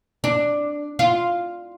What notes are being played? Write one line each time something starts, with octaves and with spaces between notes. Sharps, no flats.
D4
F4